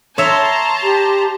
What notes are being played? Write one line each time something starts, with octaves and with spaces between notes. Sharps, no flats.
C#5 E5 A5 A#5 C6
G4